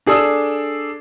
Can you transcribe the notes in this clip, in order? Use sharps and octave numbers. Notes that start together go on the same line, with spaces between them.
D4 G#4 A4 D5 D#6 E6